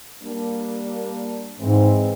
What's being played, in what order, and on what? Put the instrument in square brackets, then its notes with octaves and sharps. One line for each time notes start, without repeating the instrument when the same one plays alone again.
[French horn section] G3 A#3 D4
[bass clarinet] G#2 [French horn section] E3 G#3 C4